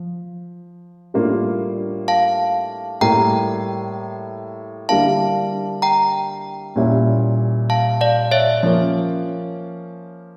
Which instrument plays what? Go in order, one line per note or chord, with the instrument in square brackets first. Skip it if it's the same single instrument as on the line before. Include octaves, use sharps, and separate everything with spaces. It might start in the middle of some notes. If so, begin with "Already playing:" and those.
Already playing: [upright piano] F3
A2 G3 A#3 D4 F4
[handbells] F5 A5
[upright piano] A2 G3 A#3 [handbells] G5 A#5
[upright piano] D3 G3 A#3 E4 [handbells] F5 A5
[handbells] G5 A#5
[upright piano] A#2 G3 C#4 E4
[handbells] F5 A5
D5 F5
C#5 E5
[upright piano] F3 A#3 C#4